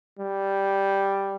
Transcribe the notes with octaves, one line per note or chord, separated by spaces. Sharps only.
G3